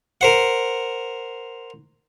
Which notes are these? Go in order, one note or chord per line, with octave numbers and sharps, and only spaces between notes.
A#4 C5 F#5